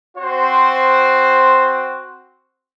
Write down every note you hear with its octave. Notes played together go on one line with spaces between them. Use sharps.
C4 F#4 C5